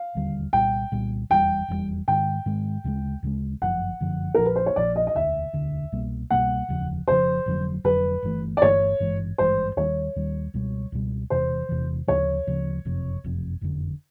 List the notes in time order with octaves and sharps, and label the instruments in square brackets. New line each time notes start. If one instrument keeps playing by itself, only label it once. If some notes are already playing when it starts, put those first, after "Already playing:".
Already playing: [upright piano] F5
[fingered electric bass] E1 D#2 D3 G3
[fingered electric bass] C2 A#2 G3 [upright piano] G5
[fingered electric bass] C2 A#2 G3
[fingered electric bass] F1 E2 B2 G3 [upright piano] G5
[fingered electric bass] F1 E2 B2 G3
[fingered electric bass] G#2 D#3 G#3 [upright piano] G5
[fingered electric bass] G#2 D#3 G#3
D2 C#3 F3 G#3
D2 C#3 F3 G#3
[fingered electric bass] G1 F#2 D3 [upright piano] F#5
[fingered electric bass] F3
G1 F#2 D3 F3
[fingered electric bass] A#1 A#2 F3 [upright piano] A#4
[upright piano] B4
C5
C#5
[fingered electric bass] A#1 A#2 F3 [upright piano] D5
[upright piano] D#5
D#5
[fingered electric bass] E1 D2 D3 [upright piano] E5
[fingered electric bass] E1 D2 D3
C2 B2 G3 A#3
[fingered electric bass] C2 B2 G3 A#3 [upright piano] F#5
[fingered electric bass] F1 D#2 C#3 F3
[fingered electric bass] F1 D#2 C#3 F3 [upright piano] C5
[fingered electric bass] F1 F2 D3 F#3
[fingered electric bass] F1 F2 D3 F#3 [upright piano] B4
[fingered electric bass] G1 G2 E3 A3
[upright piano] D5
[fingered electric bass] G1 G2 E3 A3 [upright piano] C#5
[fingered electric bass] G#1 G2 E3 G#3
[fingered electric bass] G#1 G2 E3 G#3 [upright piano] C5
[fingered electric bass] D#2 D#3 G3 [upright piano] C#5
[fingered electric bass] D#2 D#3 G3
C#2 B2 G3
C#2 B2 G3
[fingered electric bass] E1 E2 C3 E3 [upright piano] C5
[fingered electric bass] E1 E2 C3 E3
[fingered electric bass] D2 C#3 F3 [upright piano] C#5
[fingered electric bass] D2 C#3 F3
F#1 F2 C3
F#1 F2 C3
F#1 F2 D3